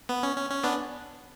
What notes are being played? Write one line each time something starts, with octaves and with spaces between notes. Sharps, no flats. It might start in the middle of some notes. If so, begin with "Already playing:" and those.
B3
C#4
C#4
C#4
B3 D4